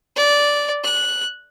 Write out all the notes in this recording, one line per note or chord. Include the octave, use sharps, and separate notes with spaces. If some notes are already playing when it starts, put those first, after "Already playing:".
D5
F#6